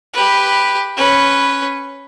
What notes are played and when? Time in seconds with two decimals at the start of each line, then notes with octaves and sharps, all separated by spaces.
0.13 G4 B4
0.97 C#4 B4